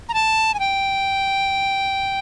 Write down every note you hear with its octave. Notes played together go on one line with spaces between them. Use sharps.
A#5
A5
G#5
G5